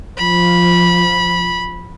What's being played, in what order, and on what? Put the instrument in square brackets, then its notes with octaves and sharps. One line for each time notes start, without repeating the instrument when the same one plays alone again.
[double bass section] F3 [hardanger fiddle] B5